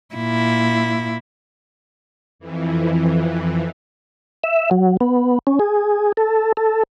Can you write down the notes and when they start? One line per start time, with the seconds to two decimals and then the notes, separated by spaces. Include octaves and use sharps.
0.15 A#2 E4
2.39 F2 E3
4.44 E5
4.71 F#3
5.01 B3
5.47 C#4
5.59 G#4
6.17 A4
6.57 A4